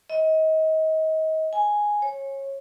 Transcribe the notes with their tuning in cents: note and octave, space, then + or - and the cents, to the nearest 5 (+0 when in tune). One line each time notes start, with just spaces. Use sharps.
D#5 +30
G#5 +0
C#5 -25